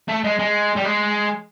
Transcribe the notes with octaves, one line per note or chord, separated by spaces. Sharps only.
A3
G#3
G#3
G3
G#3